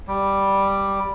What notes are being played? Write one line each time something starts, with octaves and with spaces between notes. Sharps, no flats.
G3